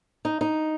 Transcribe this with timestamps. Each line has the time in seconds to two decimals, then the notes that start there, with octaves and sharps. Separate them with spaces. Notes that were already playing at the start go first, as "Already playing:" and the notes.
0.25 D#4
0.41 D#4